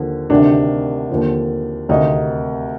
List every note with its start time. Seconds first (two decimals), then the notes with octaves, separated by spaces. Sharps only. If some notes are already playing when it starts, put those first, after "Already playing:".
Already playing: D#2 D3 F3
0.30 D2 C3 D#3 D4
1.10 D#2 D3 F3
1.89 D2 C3 D#3 D#4